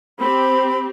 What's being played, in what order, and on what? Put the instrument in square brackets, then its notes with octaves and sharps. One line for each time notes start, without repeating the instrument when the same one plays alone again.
[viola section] C4 G4 [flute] B5